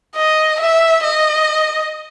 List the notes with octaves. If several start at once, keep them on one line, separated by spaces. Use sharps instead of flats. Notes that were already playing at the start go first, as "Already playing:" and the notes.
D#5
E5
D#5